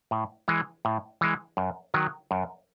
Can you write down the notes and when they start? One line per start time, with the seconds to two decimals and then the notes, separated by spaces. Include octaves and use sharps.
0.11 A2
0.48 E3 G#3
0.85 A2
1.21 E3 G#3
1.57 F#2
1.94 D#3 F#3
2.31 F#2